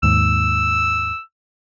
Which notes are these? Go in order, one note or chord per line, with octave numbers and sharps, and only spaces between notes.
D#2 G#2 E6